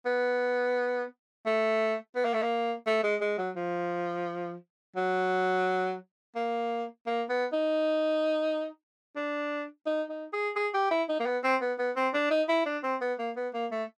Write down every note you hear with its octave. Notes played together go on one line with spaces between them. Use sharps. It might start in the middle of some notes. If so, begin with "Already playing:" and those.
B3
A3
B3
A#3
A3
A#3
A3
G#3
G#3
F#3
F3
F#3
A#3
A#3
B3
D#4
D4
D#4
D#4
G#4
G#4
G4
E4
D#4
A#3
B3
C4
B3
B3
C4
D4
D#4
E4
D4
C4
B3
A#3
B3
A#3
A3